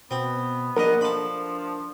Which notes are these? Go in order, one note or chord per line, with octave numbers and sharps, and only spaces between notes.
B2 B3 C4
A#1 A#2 A#4 D#5 F#5
F3 D4 A4 B5